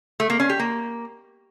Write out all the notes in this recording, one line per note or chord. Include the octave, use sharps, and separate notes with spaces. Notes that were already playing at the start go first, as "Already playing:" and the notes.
A3
A#3
C#4
G4
A#3